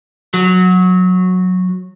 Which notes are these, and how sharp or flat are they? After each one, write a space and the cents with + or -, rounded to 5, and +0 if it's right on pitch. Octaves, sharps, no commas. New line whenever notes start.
F#3 -15